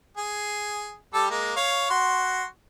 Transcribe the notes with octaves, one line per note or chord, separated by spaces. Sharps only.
G#4
G3 G4 A4
G#3 A#3
C#5 F5
F#4 C6